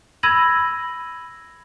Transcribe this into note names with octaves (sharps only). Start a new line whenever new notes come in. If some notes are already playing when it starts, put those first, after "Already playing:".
B5 E6 G#6 A#6 D#7 F#7